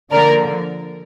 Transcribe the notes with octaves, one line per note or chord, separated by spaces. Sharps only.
D3 F3 A#3 A#4 D5